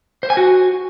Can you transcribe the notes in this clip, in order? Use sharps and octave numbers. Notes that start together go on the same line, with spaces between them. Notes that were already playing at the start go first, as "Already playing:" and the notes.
C5
G#5
F#4